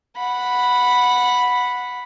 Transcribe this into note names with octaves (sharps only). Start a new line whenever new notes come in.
F#5 B5